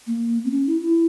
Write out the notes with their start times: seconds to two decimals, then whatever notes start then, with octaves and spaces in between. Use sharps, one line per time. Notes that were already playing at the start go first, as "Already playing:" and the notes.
0.07 A#3
0.45 C4
0.51 C#4
0.67 E4
0.81 E4